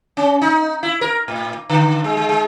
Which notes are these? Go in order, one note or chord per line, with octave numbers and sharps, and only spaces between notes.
C#4
D#4
E4
A#4
A2
D3
G#3
G#3
G#3